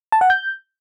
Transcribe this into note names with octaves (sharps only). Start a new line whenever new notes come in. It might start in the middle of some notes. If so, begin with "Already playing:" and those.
A5
F#5
G6